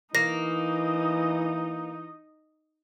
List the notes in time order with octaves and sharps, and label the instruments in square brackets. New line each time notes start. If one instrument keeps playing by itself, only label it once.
[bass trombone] E3 [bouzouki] A#3 [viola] D#4 D#5 [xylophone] A#6